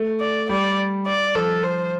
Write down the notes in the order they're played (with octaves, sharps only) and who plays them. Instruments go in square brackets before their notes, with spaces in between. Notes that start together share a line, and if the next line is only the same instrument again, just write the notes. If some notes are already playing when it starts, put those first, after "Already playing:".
Already playing: [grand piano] A3
[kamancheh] D5
[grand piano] G3 [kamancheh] D5
[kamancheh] D5
[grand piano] F3 [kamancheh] A4
[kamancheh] C5